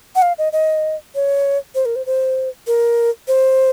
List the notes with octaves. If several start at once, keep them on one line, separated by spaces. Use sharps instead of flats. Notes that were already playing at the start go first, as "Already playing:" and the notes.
F#5
F5
D#5
D#5
C#5
C5
A#4
C5
C5
A#4
C5